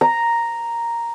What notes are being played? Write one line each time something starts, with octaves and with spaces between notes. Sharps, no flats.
A#5